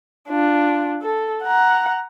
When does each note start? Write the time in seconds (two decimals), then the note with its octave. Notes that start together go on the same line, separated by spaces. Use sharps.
0.29 D4 F4
1.02 A4
1.44 F#5 A#5